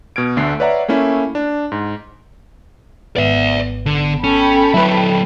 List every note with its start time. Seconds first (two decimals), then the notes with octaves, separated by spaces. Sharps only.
0.16 B2 F6 G#6 D7
0.37 D2 D3 A3 C7
0.60 B4 C#5 D5 E5 F#5 A#5
0.88 A3 A#3 C#4 E4
1.35 D4
1.72 G#2
3.16 G#1 B3 D5 E5
3.86 D3
4.24 C#4 A4 G5 B5
4.74 F#3 A3 E4 B4